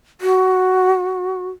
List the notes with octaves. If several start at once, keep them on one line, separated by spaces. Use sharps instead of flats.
F#4